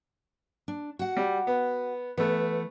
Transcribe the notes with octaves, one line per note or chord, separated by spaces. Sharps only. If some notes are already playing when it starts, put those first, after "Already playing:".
D4
F#4 F#5
G3
B3
E3 A3 B3